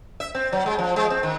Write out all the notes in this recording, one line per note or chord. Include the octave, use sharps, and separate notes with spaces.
E5
C4
F#3
G#3
F3
G#3
C4
D#3